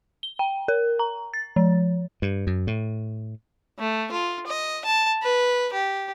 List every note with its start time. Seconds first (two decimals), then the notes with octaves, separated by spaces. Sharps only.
0.23 G7
0.39 G5
0.68 A#4
0.99 A#5
1.34 A6
1.56 F3
2.22 G2
2.47 F#2
2.67 A2
3.79 A3
4.11 F4
4.47 D#5
4.85 A5
5.23 B4
5.73 G4